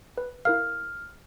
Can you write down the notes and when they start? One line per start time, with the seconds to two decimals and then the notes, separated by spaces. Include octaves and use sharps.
0.18 B4
0.45 E4 A#4 F5 F6